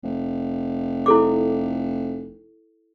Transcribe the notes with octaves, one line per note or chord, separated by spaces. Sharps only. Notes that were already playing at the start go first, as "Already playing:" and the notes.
F1
E4 A4 D6